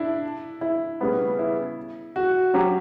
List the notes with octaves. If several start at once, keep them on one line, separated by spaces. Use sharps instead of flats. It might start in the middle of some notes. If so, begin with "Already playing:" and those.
Already playing: D4 E4
E4
C#3 G3 B3
E4
F#4
F#3 C#4 G4